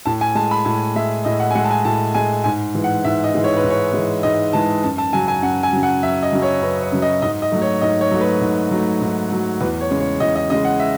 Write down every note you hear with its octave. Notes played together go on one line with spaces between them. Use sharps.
A2 A5
G#5
G#3 A5
B5
A2 A5
G#3 E5
A2 D#5
F#5
G#5
G#3 F#5
A5
G#5
A2 A5
G#3 G#5
G#2 G#5
E3 G#3
F#5
G#2 E5
D#5
E3 G#3
C#5
B4
G#2
C#5
E3 G#3
G#2 D#5
E3 G#3 A5
F#2 A5
A5
C#3 F#3 G#5
G#5
F#2 F#5
G#5
C#3 F#3
F#5
F#2 E5
D#5
C#3 F#3
C#5
F#2 B4
C#5
C#3 F#3
D#5
G#2 D#5
D#5
F#3 A3
C#5
G#2 D#5
C#5
F#3 A3
B4
G#2
F#3 A3
G#2
F#3 A3
E2 B4
C#5
C#3 G#3
C#5
E2 D#5
D#5
C#3 G#3 D#5
F#5
E5